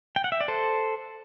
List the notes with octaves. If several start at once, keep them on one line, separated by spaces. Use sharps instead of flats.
G5
F#5
E5
D5
A4 C5